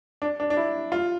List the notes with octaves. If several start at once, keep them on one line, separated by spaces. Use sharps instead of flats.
D4
D4
D4
E4
F4